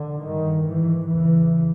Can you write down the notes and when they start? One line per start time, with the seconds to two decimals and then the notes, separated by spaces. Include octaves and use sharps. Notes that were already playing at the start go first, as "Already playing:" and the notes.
Already playing: D3
0.24 G2 D#3
0.67 G#2 E3
1.09 E2 C#3 E3